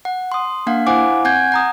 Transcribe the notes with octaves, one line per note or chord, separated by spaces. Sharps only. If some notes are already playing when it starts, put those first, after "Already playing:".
F#5
C6 D#6
A#3 D4 F5 F#5
E4 C5 F5 F#5 G#5 D6
C4 F#5 G#5 G6 G#6
F#5 A#5 D#6